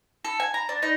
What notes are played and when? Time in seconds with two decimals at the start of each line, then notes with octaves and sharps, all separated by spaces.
0.25 A4
0.40 G#5
0.54 A#5
0.69 D4
0.82 D#4